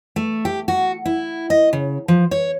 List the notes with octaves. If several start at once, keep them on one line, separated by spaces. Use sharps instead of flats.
A3
G4
F#4
E4
D#5
C#3
F3
C#5